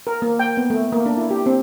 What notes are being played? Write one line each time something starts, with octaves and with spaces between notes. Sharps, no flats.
A#4
A#3
G5
B3
A3
A#3
D4
E4
G4
C4